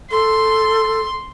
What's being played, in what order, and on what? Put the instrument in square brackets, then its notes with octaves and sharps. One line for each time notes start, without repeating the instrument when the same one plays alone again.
[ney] A4 [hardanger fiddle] C6